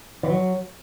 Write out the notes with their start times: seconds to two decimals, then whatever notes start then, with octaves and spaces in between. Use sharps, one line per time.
0.23 E3
0.30 F#3